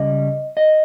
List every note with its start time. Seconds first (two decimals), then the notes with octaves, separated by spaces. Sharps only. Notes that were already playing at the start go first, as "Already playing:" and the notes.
Already playing: C#2 C#3 G3 D#5
0.57 D#5